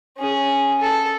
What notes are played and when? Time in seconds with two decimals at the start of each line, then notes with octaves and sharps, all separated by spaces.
0.17 C#4 G#4
0.81 A4